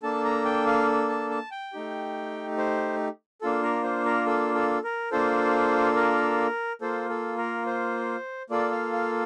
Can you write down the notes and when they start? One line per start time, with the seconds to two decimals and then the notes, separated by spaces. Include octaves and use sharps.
0.03 A#3 D4 A4 A5
0.25 A#5
0.45 G5
0.67 F5
1.09 A5
1.30 A5
1.51 G5
1.73 A3 D#4 G4
2.58 C5
3.41 A#3 D4 F4 A4
3.63 A#4
3.84 C5
4.06 A#4
4.26 A4
4.54 A4
4.84 A#4
5.11 A#3 D4 F4 A4 C5
5.96 A#4
6.81 A#3 F4 A4 C5
7.09 A4
7.38 A#4
7.66 C5
8.50 A#3 F4 A4 D5
8.71 F5
8.93 F5